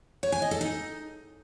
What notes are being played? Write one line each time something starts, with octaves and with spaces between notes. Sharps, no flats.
C#5
G#5
D#5
A4
D#4